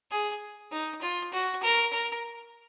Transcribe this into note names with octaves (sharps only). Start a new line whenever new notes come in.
G#4
D#4
F4
F#4
A#4
A#4